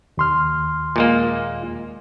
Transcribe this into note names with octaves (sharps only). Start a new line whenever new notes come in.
D#2 C6 F6
A#2 G#3 A#3